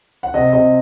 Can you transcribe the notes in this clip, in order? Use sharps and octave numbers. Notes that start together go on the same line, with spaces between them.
F#5
C3 D#5
C3 D#5